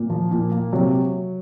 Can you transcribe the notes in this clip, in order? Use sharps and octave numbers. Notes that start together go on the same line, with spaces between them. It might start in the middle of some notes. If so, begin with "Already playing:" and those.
Already playing: A#2
F3
A#2
A#3
C3 F#3